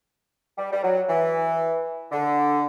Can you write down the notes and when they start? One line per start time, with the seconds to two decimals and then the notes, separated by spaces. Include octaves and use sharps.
0.58 G3
0.72 G3
0.83 F#3
1.09 E3
2.12 D3